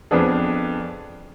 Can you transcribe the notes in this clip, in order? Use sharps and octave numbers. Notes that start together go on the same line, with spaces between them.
F2 F3 B3 D4 G#4